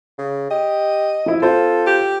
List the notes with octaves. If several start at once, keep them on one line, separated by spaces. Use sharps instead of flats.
C#3
G4 D#5
F3 E4
C4 F4 A4 C5
G4